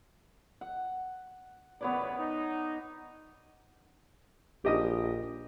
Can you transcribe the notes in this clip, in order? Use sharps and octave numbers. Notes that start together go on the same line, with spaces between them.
F#5
A1 C#3 B3 B4 C#5 D5
D#4
A#1 G4 D#5 D#6